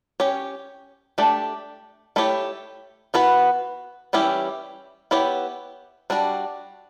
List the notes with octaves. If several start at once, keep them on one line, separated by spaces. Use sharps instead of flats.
C#4 G4 C#5
A3 D4 G4
A3 E4 G4 C#5
E3 B3 F#4 B4
E3 G3 C#4 E4 G4
B3 E4 G4 C#5
G3 D4 F#4